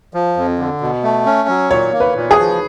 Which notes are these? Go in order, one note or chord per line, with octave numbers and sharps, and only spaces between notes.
F3
F2
D3
B2
A3
C#4
F#3
A#2 C#5
A#3
B4
A#2
G#4
F3